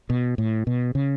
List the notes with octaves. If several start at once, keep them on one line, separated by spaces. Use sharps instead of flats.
B2
A2
B2
C#3